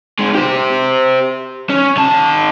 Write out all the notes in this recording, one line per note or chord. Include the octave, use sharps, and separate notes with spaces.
D#3 G#3
G4 C5
C#4
D#3 A5